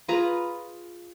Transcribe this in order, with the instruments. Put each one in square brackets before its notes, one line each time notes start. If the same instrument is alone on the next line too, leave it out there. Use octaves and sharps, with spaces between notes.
[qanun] F4 G#4 B4 A#5